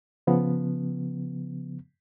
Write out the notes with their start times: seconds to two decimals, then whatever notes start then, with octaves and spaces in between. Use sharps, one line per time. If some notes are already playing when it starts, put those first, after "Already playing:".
0.27 C#3 F3 B3